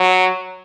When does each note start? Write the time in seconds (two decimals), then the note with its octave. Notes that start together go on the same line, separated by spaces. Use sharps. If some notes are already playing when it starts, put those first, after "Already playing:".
Already playing: F#3